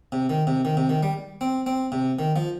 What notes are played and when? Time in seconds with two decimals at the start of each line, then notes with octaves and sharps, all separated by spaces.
0.12 C3
0.30 D#3
0.47 C3
0.65 D#3
0.77 C3
0.89 D#3
1.03 G3
1.41 C4
1.66 C4
1.92 C3
2.19 D#3
2.36 F3